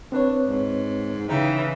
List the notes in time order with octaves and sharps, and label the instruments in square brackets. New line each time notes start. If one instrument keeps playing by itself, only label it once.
[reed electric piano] C4 B4 C#5 [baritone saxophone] D4
[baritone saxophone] G#2
[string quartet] C#3 E3 G5 [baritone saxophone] D#4